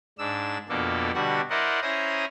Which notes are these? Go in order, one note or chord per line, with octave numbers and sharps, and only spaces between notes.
G#2 D4 E6
F2 B2 A#3 D4 A4
B2 D3 G3 D4 F#4 F#5
E4 A#4 C5 D5 D#5 F#5
C#4 E4 C5 A#5 D#6